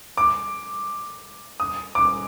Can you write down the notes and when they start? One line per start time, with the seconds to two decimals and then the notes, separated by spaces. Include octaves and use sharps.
0.17 D6
1.60 D#6
1.95 D6